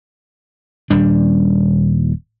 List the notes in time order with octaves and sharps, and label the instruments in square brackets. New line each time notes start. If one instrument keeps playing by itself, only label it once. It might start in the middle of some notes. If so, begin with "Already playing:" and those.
[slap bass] D#1 G3 D4